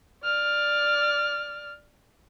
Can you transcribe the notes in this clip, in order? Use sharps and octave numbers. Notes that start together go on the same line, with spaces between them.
D5 F6